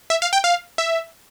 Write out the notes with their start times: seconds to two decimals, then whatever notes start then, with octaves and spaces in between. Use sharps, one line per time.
0.10 E5
0.22 F5
0.33 G5
0.44 F5
0.78 E5